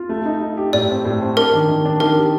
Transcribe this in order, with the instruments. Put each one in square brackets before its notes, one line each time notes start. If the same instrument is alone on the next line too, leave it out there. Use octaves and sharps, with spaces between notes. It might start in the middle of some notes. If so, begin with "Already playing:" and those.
Already playing: [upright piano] F4
A3
D#4
D#4
G4
[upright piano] A2 [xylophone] D5
[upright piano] C4
A2
C4
[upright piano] D4 [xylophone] A#4
[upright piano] D#3
D#3
D4
[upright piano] D#3 [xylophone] A#4
[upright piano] G4